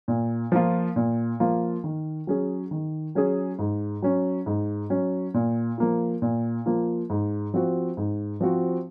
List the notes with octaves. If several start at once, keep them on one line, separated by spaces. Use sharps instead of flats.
A#2
F3 A#3 F4
A#2
F3 A#3 F4
D#3
F#3 C#4 G#4
D#3
F#3 C#4 G#4
G#2
F#3 C#4
G#2
F#3 C#4
A#2
F3 A#3 F4
A#2
F3 A#3 F4
G#2
F3 C4 F#4
G#2
F3 C4 F#4